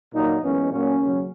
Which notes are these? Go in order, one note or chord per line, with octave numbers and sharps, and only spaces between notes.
A#2 F#3 A#3 D#4
F#2 E3 G#3 B3 C#4
A#2 F#3 A#3 C#4
D#2 C#3 F#3